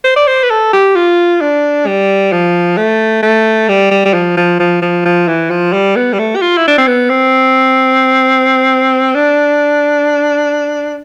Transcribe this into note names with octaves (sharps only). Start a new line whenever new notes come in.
C5
D5
C5
B4
A4
G4
F4
D4
G3
F3
A3
A3
G3
G3
G3
F3
F3
F3
F3
F3
E3
F3
G3
B3
G3
A3
G4
F4
E4
D4
C4
B3
C4
D4